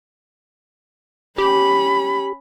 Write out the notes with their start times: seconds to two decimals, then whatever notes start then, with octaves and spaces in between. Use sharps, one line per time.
1.38 C#4 G4 B5